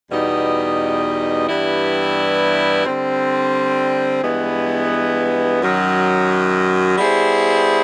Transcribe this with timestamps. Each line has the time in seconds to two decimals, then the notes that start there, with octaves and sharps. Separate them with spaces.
0.11 E2 B2 G3 B3 D#4
1.48 G2 E3 G3 B3 E4
2.85 D3 G3 C4
4.23 G2 E3 G#3 B3
5.61 F#2 D#3 F#3
6.98 G3 B3 E4 G#4 C5